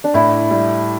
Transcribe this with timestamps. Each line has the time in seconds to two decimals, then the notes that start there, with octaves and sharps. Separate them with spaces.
0.04 D4
0.14 A2 E4
0.51 G3